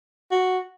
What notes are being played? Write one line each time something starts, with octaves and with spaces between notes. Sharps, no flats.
F#4